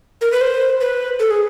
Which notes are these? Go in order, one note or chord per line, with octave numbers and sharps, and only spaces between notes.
A#4
B4
C5
B4
A4
G#4